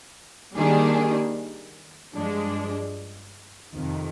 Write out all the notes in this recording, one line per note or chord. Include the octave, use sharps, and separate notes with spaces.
D#3 G3 A#3 D4 G#4
G2 F3 G#3 D4
F2 C3 D#3